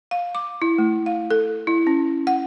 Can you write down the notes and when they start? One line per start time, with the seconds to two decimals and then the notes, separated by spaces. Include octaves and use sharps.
0.11 F5
0.35 D6
0.62 E4
0.78 A3
1.06 F5
1.31 A4
1.67 E4
1.87 C#4
2.27 F#5